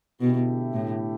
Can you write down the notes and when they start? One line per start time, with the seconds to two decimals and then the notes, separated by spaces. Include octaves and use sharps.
0.20 B2 D3 A3 E4 G4
0.73 A2